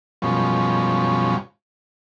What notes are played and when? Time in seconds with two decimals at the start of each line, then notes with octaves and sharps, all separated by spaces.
0.22 F#2 B2 F3 G3 G#3 C#4